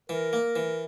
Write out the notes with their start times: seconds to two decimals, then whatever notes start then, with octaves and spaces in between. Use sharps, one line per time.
0.09 E3 A#4
0.33 A#3
0.56 E3